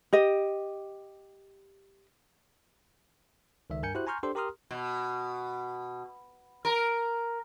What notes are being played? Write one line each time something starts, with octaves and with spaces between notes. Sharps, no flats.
G4 D#5
C#2 D#3 E5
G2 A#4 G#5 G6 C#7
E4 F#4 G4 C5 F#6
G#5 A#5 C6 C#6 F6 G6
D4 G4 A4 C5 C6
G4 A#4 A#5 C6 D#6 F6
B2
A#4